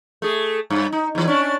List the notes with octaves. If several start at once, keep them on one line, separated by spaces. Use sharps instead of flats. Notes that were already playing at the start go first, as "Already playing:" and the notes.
A3 G#4
G2
D#4
E2 E3
C#4 D4